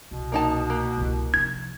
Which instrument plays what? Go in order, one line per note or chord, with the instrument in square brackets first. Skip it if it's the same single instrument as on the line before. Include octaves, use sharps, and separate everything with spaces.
[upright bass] C2 [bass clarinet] B2
[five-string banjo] A#3 D#4 A5
A#3
[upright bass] C2 C3
[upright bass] C3 F3 [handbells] G#6